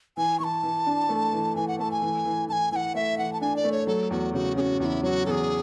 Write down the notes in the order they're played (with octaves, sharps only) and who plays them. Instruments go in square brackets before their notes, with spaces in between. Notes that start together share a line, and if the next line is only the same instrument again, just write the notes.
[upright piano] E3 [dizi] G#5
[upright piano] E3 [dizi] A5 C#6
[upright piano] E3
D4
A3
E3
[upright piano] E3 [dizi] G#5
[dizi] F#5
[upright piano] A3 [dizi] A5
[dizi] G#5
[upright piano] E3
E3
[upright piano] E3 [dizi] A5
[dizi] G#5
[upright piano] E3 [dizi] F#5 G#5
[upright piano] A3 [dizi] E5
[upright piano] E3 [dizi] F#5
[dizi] A5
[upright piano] D4 [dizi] G#5
[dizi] D5
[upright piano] A3
[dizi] C#5
[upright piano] F#3 [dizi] A4
[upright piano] E2 [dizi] F#4
[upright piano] C#3 [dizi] F#4
[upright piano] C#4 [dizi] G#4
[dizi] F#4
[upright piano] E2 [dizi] F#4
[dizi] E4
[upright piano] F#3 [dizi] F#4
[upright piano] E2 [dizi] G#4 A4